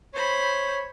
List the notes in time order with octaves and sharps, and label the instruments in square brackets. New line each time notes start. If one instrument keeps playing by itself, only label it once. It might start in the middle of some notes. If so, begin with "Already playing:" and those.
[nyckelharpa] C5 B5 [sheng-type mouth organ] C#5